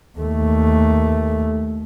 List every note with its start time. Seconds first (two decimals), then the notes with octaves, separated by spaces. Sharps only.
0.18 D#2 A3